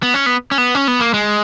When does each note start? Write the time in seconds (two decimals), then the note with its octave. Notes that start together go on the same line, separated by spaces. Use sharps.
0.03 B3
0.14 C#4
0.26 B3
0.51 C#4
0.58 B3
0.75 C#4
0.88 B3
1.01 A#3
1.14 G#3